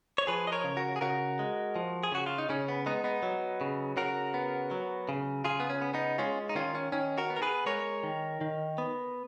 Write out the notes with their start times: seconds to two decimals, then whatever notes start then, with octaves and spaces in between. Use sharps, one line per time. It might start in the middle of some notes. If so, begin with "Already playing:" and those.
0.18 C#5
0.27 F3 G#4 B4
0.47 D#5
0.52 A#4 C#5
0.64 C#3
0.77 F#4 A#4
0.96 G#4
1.01 C#3 F#4 A#4
1.39 G#3
1.76 F3
2.03 G#4
2.12 C#3 F#4
2.26 F4
2.38 D#4
2.49 C#3 C#4
2.68 B3
2.86 G#3 B3 D#4
3.04 B3 D#4
3.23 F#3
3.61 C#3
3.97 C#3 F#4 A#4
4.34 B3
4.71 F#3
5.09 C#3
5.44 C#3 F4 G#4
5.60 B3
5.70 C#4
5.81 B3
5.94 B3 D#4
6.18 G#3 C#4 F4
6.49 D#4
6.55 D#3 C#4 F4
6.75 C#4
6.92 D#3 C#4
7.18 F#4 A#4
7.30 B3
7.36 A#4
7.42 G#4 B4
7.66 G#3 A#4 C#5
8.03 D#3
8.41 D#3
8.78 B3